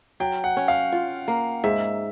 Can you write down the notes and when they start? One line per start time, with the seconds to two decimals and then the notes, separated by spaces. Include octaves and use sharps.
0.20 F#3 G5
0.44 F#5
0.57 C#4
0.68 F5
0.92 F4
1.28 A#3
1.64 G#2 E5